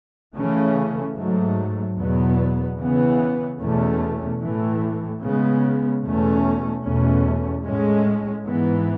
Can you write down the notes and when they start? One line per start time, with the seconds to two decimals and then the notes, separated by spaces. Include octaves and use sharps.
0.36 C#3 E3 A3 C#4
1.16 G#2 F#3 A3
1.97 E2 B2 F#3 B3
2.78 C#3 E3 B3
3.60 E2 B2 A3 C#4
4.40 A2 E3 A3
5.21 C#3 G#3 B3
6.02 E2 B2 A3 C#4
6.83 E2 B2 A3 C#4
7.63 A2 G#3 C#4
8.45 G#2 E3 B3